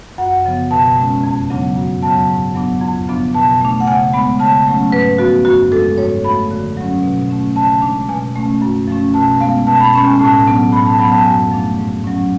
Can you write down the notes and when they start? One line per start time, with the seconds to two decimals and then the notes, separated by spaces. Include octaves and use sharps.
0.18 F#2 F#5
0.44 C#3 F3 B3
0.71 B2 A5
0.97 G#3 C#4
1.24 F2
1.50 C#3 F#3 B3 D4
1.76 F#2
2.02 C#3 F#3 B3 A5
2.29 G#2
2.55 F#3 B3 D4
2.81 F2
3.08 C#3 F3 B3 D4
3.34 B2 A5
3.61 A3 D4
3.80 F#5
3.87 C#3 G#5
4.13 G#3 B3 D4 B5
4.40 C#3 A5
4.66 F#3 A3 C#4
4.92 G#2 B4
5.18 F3 B3 F#4
5.45 F#2 F#4
5.72 F3 G#3 D4 A4
5.98 G#2 C#5
6.24 F3 A3 D4 B5
6.51 D3
6.77 F#3 C#4
7.03 B2
7.30 A3 C#4
7.56 C#3 A5
7.82 G#3 D4
8.09 B2 G#5
8.36 A3 C#4
8.62 F#2
8.88 F3 A3 C#4
9.14 B2 A5
9.40 G#3 B3 F5
9.67 B2 A5
9.80 B5
9.93 G#3 C#4 B5
10.06 G#5
10.19 A2 A5
10.46 F#3 B3 D4
10.72 A2 B5
10.86 A5
10.99 F#3 B3 B5
11.12 A5
11.25 F#2 G#5
11.51 F3 A3 D4
11.78 G#2
12.04 F#3 C#4